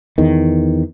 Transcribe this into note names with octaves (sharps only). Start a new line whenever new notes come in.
E2 D#3